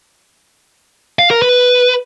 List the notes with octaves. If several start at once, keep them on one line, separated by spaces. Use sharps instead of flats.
F5
A#4
B4